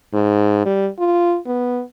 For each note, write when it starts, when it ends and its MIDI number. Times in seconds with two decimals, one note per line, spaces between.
0.13 0.64 44
0.66 0.89 55
0.99 1.37 65
1.46 1.82 59